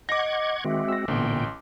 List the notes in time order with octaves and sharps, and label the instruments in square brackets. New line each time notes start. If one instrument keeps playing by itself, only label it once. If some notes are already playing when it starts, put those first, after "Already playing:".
[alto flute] D#5 [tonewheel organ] F#5 C#6 G#6 [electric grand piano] D6 A#6
[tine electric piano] D#3 [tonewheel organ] G#3 C4 F#4 [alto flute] E5
[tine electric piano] E6 A#6
[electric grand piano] A1 [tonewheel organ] A#2 G5 [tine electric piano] D3 A#3 B3 [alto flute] C6